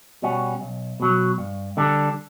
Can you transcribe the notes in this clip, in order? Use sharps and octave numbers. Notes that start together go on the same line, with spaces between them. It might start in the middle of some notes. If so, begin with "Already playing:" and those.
B2 G3 C#4 F#4
B1
B2 F#3
G2
D3 G3 D4